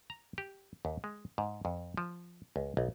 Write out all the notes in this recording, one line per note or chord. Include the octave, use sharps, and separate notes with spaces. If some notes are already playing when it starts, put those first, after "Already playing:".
A#5
G4
D#2
G#3
G#2
F2
F3
C#2
B1